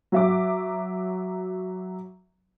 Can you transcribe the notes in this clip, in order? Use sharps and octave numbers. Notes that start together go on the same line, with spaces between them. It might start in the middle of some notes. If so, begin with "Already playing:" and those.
F#3 E5 D6